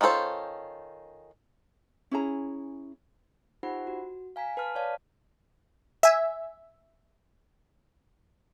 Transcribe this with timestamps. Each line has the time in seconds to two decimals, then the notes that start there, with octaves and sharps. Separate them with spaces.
0.01 D#3 C#4 F4 A4 C5
2.11 C#4 E4 G#4 A#5
3.63 D#4 F4 G4 C5 F#5 B5
3.87 F#4
4.36 F5 G#5 A#5 B6
4.57 B4 A5 F6
4.75 C#5 D5 F5 A5
6.03 E5 G#5